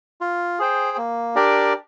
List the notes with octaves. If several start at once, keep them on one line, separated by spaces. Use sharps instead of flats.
F4
G#4 C5 G5
A#3
D4 G4 A#4 D5